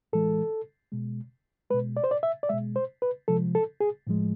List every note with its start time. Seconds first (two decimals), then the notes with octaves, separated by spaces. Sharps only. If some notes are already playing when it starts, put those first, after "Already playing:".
0.13 A2 E3 G#3 A4
0.92 B2 G#3
1.70 G#3 B4
1.74 B2
1.97 D5
2.04 C5
2.11 D5
2.23 E5
2.43 D5
2.49 B2 G#3 E5
2.76 C5
3.02 B4
3.28 C3 F3 G#3 A4
3.55 A4
3.81 G#4
4.07 A2 F3 G#3